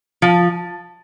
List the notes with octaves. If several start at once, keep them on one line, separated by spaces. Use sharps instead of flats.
F3